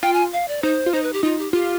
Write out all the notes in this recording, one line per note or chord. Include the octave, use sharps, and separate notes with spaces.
F4 G5
G#5
F5
D5
D#4 C5
F4
D#4 C5
B4
G4
D#4 F4
G4
F4 G4